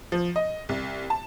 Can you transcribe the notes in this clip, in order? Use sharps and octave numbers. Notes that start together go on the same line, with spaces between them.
F3
D#5
C2
A5